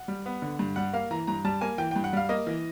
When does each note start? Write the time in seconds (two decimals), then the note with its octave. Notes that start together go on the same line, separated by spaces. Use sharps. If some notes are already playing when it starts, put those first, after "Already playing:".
Already playing: F#5
0.08 G3
0.26 B3
0.42 D3
0.59 G2
0.76 G3 F#5
0.93 A#3 F5
1.11 E3 A#5
1.27 G2 A#5
1.45 G3 A5
1.61 A#3 G#5
1.78 E3 G5
1.91 G2 G5
2.04 F#5
2.13 G3 F5
2.29 A#3 D#5
2.47 E3